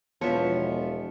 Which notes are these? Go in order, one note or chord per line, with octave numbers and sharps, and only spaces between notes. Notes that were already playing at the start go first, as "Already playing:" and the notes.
E1 F3 B3 F4 C#5 E5